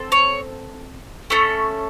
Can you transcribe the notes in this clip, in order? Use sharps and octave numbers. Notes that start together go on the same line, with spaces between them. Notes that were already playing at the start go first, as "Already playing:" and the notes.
Already playing: C4 A4
C#5
A3 C#4 A4